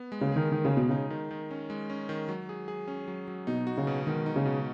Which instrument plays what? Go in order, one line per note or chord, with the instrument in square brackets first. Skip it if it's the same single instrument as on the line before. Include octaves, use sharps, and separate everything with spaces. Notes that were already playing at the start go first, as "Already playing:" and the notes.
Already playing: [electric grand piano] B3
G#3
[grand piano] C#3
[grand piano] D#3 [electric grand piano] G#4
[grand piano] D#3 [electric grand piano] D#4
[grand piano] C#3
[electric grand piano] G#3
[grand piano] B2
[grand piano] C#3 [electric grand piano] D#4
[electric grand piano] D#3
D#3
C#4
G#3
C#4
D#3
F#3
G#4
G#4
C#4
F#3
F#3
[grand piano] B2 [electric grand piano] D#4
[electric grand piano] F#4
[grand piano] C#3
[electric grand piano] B2
[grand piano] D#3 [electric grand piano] G#3
[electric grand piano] D#4
[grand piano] C#3
[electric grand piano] B2